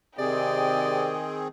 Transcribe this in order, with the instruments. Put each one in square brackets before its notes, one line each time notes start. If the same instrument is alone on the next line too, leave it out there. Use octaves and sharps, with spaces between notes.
[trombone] C3 [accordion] D#3 C4 G#4 [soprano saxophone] D5 [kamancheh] D#5 G5